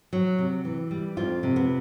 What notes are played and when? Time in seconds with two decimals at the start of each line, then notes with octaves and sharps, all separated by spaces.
0.13 F#3
0.38 C3
0.65 E3
0.91 G3
1.17 F2 F4
1.43 C3
1.56 B3